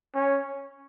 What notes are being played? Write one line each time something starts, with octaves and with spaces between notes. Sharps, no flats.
C#4